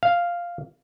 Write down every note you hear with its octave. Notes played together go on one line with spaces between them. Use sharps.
F5